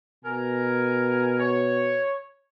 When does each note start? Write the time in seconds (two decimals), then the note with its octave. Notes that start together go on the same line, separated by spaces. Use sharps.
0.25 B2 A#4 G#5
1.39 C#5